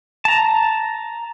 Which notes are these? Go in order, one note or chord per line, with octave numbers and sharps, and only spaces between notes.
A5 A#5